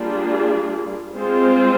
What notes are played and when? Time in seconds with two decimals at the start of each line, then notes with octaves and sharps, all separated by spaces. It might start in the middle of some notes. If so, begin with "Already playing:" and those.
Already playing: G3 A#3 D4 F4 G#4
1.14 G#3 C4 F4 C5